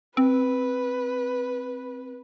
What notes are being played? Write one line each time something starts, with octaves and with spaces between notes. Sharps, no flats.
C4 B4